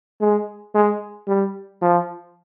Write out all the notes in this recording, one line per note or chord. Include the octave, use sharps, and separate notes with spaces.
G#3
G#3
G3
F3